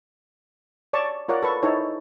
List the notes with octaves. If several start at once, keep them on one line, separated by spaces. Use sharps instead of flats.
C#5 D5 A5 C#6
F4 A#4 C#5 D5 F#5
A4 B4 C#6
D#4 E4 A4 C5 C#5